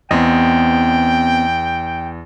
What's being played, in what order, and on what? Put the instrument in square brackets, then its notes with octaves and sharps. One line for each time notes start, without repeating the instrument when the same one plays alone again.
[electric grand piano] E2 [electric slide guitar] B3 C4 D#5 [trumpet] G5